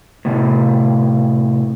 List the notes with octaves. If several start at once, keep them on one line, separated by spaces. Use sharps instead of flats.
A2 C3